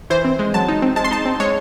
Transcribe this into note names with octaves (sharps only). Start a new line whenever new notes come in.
E3 C5
C4
G#3
F#3 A5
D#4
C4
G#3 A5
C6
D#4 A5
C4
G#3 C#5